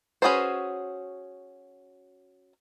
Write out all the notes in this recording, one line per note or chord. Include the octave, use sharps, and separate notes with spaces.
C#4 F#4 G#4 B4 C5